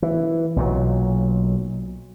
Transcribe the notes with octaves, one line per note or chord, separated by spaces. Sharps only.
E3
B1 A#2 F#3